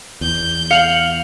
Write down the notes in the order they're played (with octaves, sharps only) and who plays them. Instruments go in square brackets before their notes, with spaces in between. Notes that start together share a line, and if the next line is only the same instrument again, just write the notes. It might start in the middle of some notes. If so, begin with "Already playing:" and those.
[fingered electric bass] E2 [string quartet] G6
[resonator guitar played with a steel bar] F5 [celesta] C#7 F7 F#7